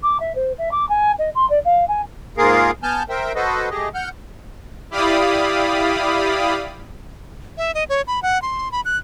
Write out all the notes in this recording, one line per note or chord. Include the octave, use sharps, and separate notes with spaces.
D6
E5
C5
E5
D6
G#5
D#5
C6
D5
F5
G#5
G#2 A#3 F4 G#4 A#4 F5
B3 G#5 A5 F6 G6
A#4 C5 E5 G5
F#4 A4 B4 C5 D#5
A3 G4 G#4 D#5
F#5 F6 G6
E4 G4 D5 F5 B5 D#6
E5
D#5
C#5
B5
F#5
C6
B5
F#6